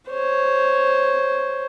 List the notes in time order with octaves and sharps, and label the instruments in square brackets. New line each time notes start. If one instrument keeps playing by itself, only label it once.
[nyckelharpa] C5 C#5